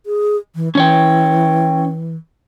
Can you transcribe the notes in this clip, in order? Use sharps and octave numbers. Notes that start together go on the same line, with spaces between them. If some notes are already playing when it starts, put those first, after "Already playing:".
G#4
E3
E3 C#4 C#5 G5